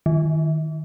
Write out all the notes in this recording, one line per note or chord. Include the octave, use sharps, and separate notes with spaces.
D#3